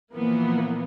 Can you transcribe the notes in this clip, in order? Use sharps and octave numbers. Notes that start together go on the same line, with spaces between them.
A#2 E3 F3 A#3 B3